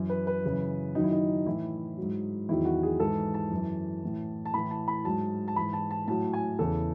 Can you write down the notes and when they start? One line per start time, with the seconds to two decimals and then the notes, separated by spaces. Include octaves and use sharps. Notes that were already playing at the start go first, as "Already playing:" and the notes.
Already playing: F#2 E3
0.10 B4
0.27 B4
0.44 F#2 C#3 E3
0.95 F#2 D#3 F#3 D#4
1.04 E4
1.12 D#4
1.46 A2 E3 E4
1.97 F#3
2.02 G#2
2.49 E2 D#3 F#3 E4
2.65 F#4
2.83 G#4
3.00 G#2 E3 A4
3.34 A5
3.51 F#2 E3
4.02 A2 E3
4.45 A5
4.54 A2 E3 B5
4.71 A5
4.88 B5
5.05 G#2 F#3 A5
5.48 A5
5.56 G#2 E3 B5
5.73 A5
5.91 A5
6.08 A2 F#3 A5
6.33 G#5
6.59 E2 C#3 E3 A4